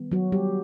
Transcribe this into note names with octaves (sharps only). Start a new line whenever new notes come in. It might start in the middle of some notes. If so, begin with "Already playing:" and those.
Already playing: D#3 G3 B3
F#3 F#4
G3 G4